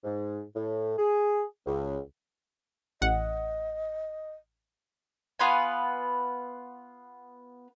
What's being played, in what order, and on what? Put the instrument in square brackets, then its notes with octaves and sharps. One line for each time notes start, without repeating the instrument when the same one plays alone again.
[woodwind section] G#2
A2
G#4
C#2
[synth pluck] A1 F#5 [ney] D#5
[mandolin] B3 F4 B4 G#5